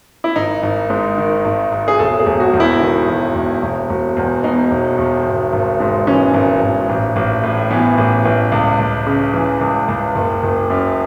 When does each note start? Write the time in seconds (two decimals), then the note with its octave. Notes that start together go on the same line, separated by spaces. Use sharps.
0.24 E4
0.36 G#1 D#4
0.63 G#1
0.90 G#2
1.18 D#3
1.45 G#1
1.72 G#1
1.88 G#4
1.99 E1 A4
2.19 G#4
2.26 E1
2.40 F#4
2.53 E2
2.60 E4
2.81 D#3
3.08 E1
3.35 E1
3.62 E1
3.89 E1
4.16 E2
4.44 B2 D#4
4.71 E1
4.98 E1
5.26 G#1
5.53 G#1
5.80 G#2
6.07 E3 C#4
6.34 G#1
6.61 G#1
6.89 A1
7.16 A1
7.43 A2
7.70 E3 B3
7.98 A1
8.25 A1
8.52 C#2
8.79 C#2
9.07 C#3
9.34 E3
9.61 C#2
9.88 C#2
10.15 F#1
10.43 F#1
10.70 F#2